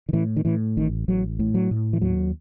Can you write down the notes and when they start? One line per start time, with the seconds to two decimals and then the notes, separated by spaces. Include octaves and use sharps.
0.09 D#3
0.13 A2 E3
0.36 D#3
0.45 A2 E3
0.77 A1 D#3
1.08 A1 F#3
1.39 A2
1.54 F#3
1.71 A2
1.93 E3
2.01 D#2 F#3